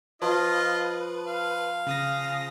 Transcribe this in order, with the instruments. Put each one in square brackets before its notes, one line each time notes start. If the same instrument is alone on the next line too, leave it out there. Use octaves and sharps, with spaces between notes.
[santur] F3 [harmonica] F4 D#5 [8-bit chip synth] B4
[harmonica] F5
[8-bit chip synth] C#3 D#6 A#6